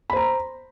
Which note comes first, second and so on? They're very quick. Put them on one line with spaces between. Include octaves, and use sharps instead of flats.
B5 C5 A#5